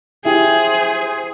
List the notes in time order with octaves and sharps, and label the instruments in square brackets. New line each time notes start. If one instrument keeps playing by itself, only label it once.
[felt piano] E4 G4 G5 [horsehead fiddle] G#4 C5